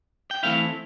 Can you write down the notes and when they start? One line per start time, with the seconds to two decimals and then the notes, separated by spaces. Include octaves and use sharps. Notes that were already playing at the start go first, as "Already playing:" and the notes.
0.31 G5
0.43 E3 A3 C4 E4 F5